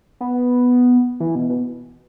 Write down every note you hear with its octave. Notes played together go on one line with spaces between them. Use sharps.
B3
E3
B2
B2